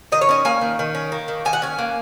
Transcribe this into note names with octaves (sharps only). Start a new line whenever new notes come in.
D#3 D#5
C#5
C#4 D#5
A#3 G#5
D#3
D#3
C#4
A#3
D#3
D#3 G#5
F#5
C#4 G#5
A#3